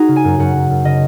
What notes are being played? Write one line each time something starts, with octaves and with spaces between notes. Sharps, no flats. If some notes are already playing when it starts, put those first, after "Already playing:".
Already playing: D#4 F#4 G#4 A#5
C#3
G#5
F#2
F#2 F#5
F#2
F#2
C#3 D#5